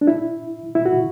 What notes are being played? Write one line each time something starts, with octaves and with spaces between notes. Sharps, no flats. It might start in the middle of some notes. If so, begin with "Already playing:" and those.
D4
E4
E4
F#4